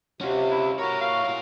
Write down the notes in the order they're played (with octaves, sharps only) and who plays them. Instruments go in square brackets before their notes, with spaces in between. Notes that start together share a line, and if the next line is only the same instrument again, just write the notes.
[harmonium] C3 [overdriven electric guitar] C#4 F4 [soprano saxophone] F#4
[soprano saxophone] E4
[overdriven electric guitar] E4 C#5 [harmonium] F#4 [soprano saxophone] A#4
[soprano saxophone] F5
[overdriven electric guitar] F4 A#4